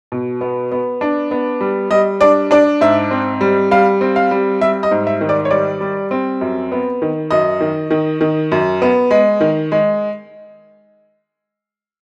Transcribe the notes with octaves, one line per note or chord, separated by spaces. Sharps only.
B2
B3
B3
D4
B3
G3
G3 D#5
D4 D5
D4 D5
G#2 E5
C4
G3
G3 F5
C4
F5
G3
G3 E5
D#5
G#2
E5
D#3
D5
C#5
G3 D5
G3
C4
F#2
B3
D#3
F#2 D#5
D#3
D#3
D#3
F#2
B3
G#3
D#3
G#3